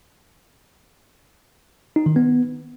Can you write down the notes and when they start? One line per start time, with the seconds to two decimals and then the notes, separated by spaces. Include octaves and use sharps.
1.96 D#4
2.06 D#3
2.16 B3